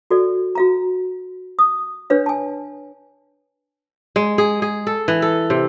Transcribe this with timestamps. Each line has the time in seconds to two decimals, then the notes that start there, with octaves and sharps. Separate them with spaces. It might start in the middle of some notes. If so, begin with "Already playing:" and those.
0.11 F#4 A4 D5
0.55 F#4 F5 A#5
1.59 D#6
2.10 D4 B4 C#5 F5
2.26 G#5 A5
4.16 G#3
4.38 G#4
4.62 G#4
4.87 A4
5.08 E3
5.22 A4
5.50 C3